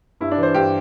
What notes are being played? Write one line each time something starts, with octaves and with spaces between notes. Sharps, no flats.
G2 E4
D4
E3
C5
G2 G4